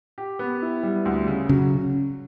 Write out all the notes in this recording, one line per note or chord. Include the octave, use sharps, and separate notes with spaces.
G4
B3
E4
G3
D2
C#3
C#3 F#3